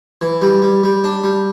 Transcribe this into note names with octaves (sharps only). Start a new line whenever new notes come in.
E3
G3
G3
G3
D4
G3